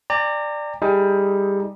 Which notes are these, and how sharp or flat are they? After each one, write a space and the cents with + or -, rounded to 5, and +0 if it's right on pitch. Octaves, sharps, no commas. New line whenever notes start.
D5 +10 G5 +45 A#5 -30
G3 +20 D#4 +30 G#4 +20